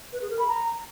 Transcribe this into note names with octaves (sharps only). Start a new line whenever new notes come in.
B4
G#4
A#4
B5
A#5